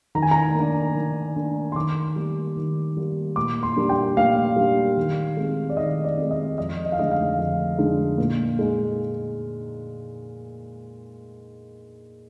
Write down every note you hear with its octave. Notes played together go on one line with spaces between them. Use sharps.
D#3 A#5
G#5
A#5
A#3 D4
D#3
A#3 D4
C6
D#3 D6
G3 A#3
D#3
G3 A#3
A#2 D6
C6
G3 A#3 D4
G5
A#2 F5
G3 A#3 D4
D#3
G#3 C4
D5
D#3 D#5
D5
G#3 C4
D#5
F2 D#5
D#5
F5
D3 G#3 D#4 D#5
F5
F2
D3 G#3 D#4
A#2
G#3 D#4